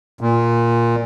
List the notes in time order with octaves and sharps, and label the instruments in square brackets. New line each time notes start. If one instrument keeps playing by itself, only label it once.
[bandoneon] A#2